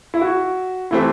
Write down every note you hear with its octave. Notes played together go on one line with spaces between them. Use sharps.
E4
F#4
E3 A3 C4 E4 G4